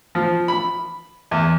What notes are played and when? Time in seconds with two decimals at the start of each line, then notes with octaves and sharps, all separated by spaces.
0.15 F3
0.48 B5
1.31 E2